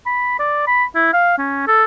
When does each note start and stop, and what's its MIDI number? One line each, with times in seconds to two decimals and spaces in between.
0.06 0.39 83
0.39 0.64 74
0.67 0.84 83
0.95 1.11 64
1.13 1.38 77
1.38 1.66 61
1.67 1.85 69